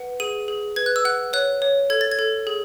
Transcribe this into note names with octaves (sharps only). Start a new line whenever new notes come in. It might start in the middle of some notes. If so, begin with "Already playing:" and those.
Already playing: B4 F#5
G#4 D#7
G#4
B4 G#6
F#6
E6
F#5 F#6
C#5 F#6
C#5
A4 G#6
A6
G#6
A4
G#4